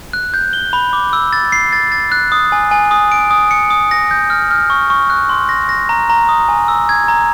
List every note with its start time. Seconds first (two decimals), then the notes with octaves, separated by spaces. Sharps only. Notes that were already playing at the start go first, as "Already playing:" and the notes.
0.13 F#6
0.34 G6
0.53 G7
0.73 B5
0.93 D6
1.13 E6
1.33 A6
1.52 C7
1.73 A6
1.92 A6
2.12 F#6
2.32 D#6
2.52 G#5
2.71 G#5
2.91 D#6
3.12 D7
3.31 D#6
3.51 C#7
3.70 D#6
3.91 A#6
4.11 G6
4.30 F6
4.51 F6
4.70 C#6
4.90 C#6
5.10 F#6
5.29 C6
5.49 A#6
5.69 A#6
5.89 A#5
6.10 A#5
6.29 D#6
6.49 G#5
6.68 E6
6.89 G#6
7.08 A#5